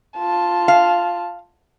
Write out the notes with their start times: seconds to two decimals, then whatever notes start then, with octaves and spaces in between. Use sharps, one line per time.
0.17 F4 A5
0.68 F5